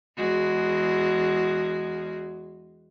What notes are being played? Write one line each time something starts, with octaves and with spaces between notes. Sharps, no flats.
E2 G#3 F#4